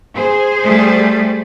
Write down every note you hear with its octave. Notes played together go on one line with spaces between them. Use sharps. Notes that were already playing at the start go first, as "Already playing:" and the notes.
G#4 C5
G3 A3